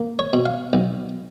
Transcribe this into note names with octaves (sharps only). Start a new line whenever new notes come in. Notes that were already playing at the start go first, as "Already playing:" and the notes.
Already playing: A#3
C#5
B2
F5
B1